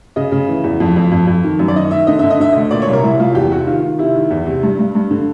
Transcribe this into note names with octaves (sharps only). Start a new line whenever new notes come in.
C#3 D#5
C#3
E3
E2
F2
F2
F2
F2
D#3
F#2
D5
D#3 D#5
D#3 E5
D3 D#5
D3 E5
D#5
D3 E5
D2 D#5
A#2 D5
C#5
C2
A#4
C2 E4
C2 F4
E2 G4
C3 F#4
D#3 F4
D#3
C3 E4
D#3
E2
C3
G2
G2
G2
D3